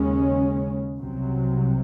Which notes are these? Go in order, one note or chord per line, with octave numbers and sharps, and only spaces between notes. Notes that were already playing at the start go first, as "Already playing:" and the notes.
Already playing: D#2 C#3 G#3 C#4
C2 C3 F#3